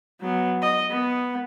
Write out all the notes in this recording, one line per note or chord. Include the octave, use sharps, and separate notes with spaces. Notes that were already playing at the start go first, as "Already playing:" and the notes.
F#3 B3
D#5
B3